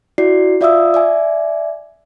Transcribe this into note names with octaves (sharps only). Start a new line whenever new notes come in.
E4 F#4 D5 C7
F4 D5 E5 F5 D#6 E6
D5 E5 G#5